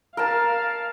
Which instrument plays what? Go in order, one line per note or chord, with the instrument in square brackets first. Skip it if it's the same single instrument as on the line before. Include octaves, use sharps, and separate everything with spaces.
[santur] A#4 A5 [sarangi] F5